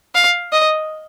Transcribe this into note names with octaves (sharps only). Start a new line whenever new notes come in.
F5
D#5